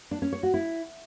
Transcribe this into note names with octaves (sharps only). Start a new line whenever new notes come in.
D4
C#4
C#5
F#4
E4